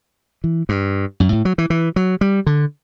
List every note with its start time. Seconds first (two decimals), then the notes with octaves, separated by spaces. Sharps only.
0.44 E3
0.69 G2
1.20 F#2
1.32 A2
1.45 F#3
1.58 E3
1.70 E3
1.96 F#3
2.21 G3
2.46 D3